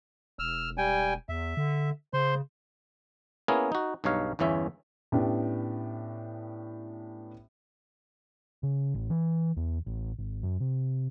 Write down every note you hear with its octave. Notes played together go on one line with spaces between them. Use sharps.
E1 E6 F6
G3 G5 G#5
E2 E5
D3
C#3 C5 C6
A#3 B3 C#4 E4 G#4 A#4
D#4 F#4
B1 G2 D#4 C#5 F5
G1 E2 E3 C#4 E5
A2 B3 C#4 D4 G4
C#3
A1
E3
E2
A1
G#1
F#2
C3